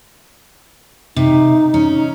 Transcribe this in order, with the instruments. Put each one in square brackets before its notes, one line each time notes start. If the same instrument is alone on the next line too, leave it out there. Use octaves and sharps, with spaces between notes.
[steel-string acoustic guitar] C3 [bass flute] D#4
[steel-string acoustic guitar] C#4